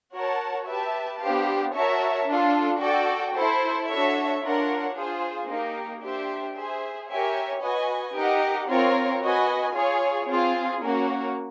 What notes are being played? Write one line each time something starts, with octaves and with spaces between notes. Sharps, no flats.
F#4 A#4 C#5 F#5 A5
G4 B4 E5 A5
B3 D4 G4 C5 F5
F#4 A#4 C#5 E5 A5
D4 F4 A4
F#4 A4 D5 G5
E4 A4 C5
D4 F#4 A4 C#5 E5
D4 F4 A#4 C#5 F#5
F4 G#4 C5
A#3 D#4 G4
D4 G4 C5 E5
G#4 C5 E5
G4 A#4 C#5 E5 G#5
F#4 B4 D#5 G#5
D#4 G4 A#4 D#5 F#5
C4 F4 A#4 C#5
F#4 B4 D#5 G#5
F4 G#4 C#5
C4 F4 G#4
A#3 C#4 F#4